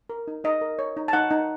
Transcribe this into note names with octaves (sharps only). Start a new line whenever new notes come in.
A#4
D#4
D#4 D#5
A#4
C#5
D#4
A5
D#4 F#5
D#4